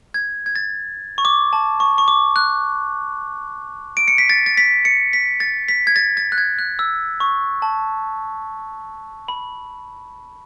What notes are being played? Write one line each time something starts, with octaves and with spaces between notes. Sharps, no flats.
G#6
G#6
A6
C#6
D6
A5
C#6
C#6
D6
F#6
D7
C#7
B6
A6
A6
B6
C#7
B6
A6
B6
G#6
A6
A6
F#6
G#6
F#6
E6
C#6
A5
B5